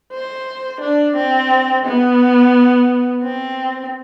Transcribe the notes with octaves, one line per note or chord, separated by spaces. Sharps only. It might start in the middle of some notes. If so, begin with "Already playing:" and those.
C5
D4
C4
B3
C4